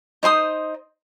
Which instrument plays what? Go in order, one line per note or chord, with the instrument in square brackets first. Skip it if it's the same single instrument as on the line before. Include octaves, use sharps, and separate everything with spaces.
[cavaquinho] D#4 C5 C6 D#6